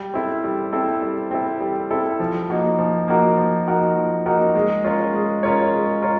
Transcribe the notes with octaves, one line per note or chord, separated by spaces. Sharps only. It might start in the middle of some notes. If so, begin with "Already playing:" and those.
Already playing: G3
C4 E4 A4
G3
C4 E4 A4
G3
C4 E4 A4
G3
C4 E4 A4
F3
A#3 D#4 F#4 A#4
F3
A#3 D#4 F#4 A#4
F3
A#3 D#4 F#4 A#4
F3
A#3 D#4 F#4 A#4
G#3
C#4 F4 A#4 C#5
G#3
C#4 F4 A#4 C#5
G#3
C#4 F4 A#4 C#5